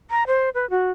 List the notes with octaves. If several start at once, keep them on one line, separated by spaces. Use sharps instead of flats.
A#5
C5
B4
F#4